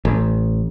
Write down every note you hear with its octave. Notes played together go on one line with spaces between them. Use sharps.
A1